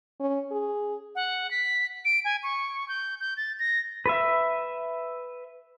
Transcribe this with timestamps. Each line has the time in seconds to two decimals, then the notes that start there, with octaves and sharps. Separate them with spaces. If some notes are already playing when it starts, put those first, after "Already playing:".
0.20 C#4
0.51 G#4
1.15 F#5
1.51 B6
2.05 D7
2.25 G#5
2.43 C#6
2.89 G6
3.20 G6
3.37 A6
3.59 A#6
4.06 B4 E5